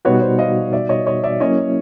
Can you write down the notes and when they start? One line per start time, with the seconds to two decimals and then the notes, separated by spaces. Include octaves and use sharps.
0.05 B2 G3 B3 D#4 F#4 B4 C#5
0.21 C5 D5
0.39 D#5 F5
0.73 D5 E5
0.89 C#5 D#5
1.06 C#5 D#5
1.24 D5 E5
1.40 F#3 A#3 C#4 E4 C#5 D#5